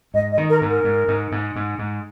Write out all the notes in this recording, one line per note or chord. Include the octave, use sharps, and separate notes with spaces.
G#2 D#5
D#5
D#3
A#4
G#2
A#4
G#2
G#2
G#2
G#2
G#2